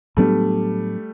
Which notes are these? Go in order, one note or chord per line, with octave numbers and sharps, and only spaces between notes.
A2 F#3 G3 A3 B3 D4